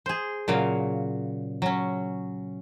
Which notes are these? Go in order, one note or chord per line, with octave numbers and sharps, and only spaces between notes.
G#4 C5
A#2 C#3 F#3 F5
F#3 C#4